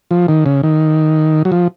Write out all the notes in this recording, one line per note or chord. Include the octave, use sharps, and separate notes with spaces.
F3
D#3
C#3
D#3
F#3
F3